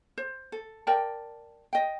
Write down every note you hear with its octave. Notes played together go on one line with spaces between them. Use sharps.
C5
A4
A#4 D5 G5 A5
D#5 G5